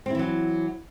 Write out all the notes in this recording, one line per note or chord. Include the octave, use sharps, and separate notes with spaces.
E3 F#3 C4 E4